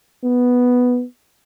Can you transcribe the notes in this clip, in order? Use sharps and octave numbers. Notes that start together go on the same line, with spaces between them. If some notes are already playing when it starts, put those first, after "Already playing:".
B3